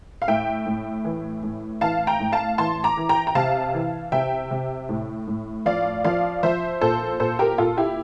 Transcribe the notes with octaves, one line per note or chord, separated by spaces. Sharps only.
F5
A2 E5 G5
A2
E3
A2
E3 F5 A5
G5 A#5
A2
F5 A5
E3 A5 C6
A#5 D6
E3
G5 A#5
A#5
C3 F5 A5
E3
C3 E5 G5
C3
A2
A2
F3 D5 F5
F3 D5 F5
F3 C5 E5
A#2 A4 C5
A#2 A4 C5
G4 A#4
A#2 F4 A4
E4 G4